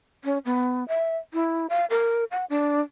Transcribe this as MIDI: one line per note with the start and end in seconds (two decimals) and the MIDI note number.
0.24 0.38 61
0.45 0.86 59
0.88 1.17 76
1.33 1.67 64
1.70 1.85 77
1.90 2.24 70
2.31 2.45 78
2.50 2.81 62